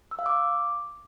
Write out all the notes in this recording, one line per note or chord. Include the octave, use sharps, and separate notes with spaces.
E6
F5
D6